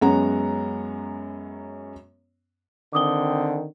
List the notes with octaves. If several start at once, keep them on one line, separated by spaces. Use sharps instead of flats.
F#2 G#3 B3 C#4 F#5 A#5
D3 D#3 C4 D6 D#6 G7